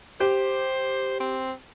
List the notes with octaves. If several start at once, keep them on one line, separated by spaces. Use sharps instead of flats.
G4 C5
C4